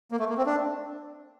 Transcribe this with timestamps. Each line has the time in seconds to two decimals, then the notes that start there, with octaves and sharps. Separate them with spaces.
0.11 A#3
0.20 A3
0.29 A#3
0.38 C4
0.46 D4